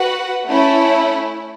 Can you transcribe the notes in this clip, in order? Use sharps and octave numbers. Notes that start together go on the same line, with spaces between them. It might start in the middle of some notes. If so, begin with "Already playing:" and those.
Already playing: F#4 B4 F#5
A3 C#4 E4